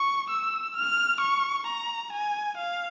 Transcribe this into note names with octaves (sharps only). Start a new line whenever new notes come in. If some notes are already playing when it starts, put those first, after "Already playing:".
Already playing: C#6
E6
F6
C#6
A#5
G#5
F5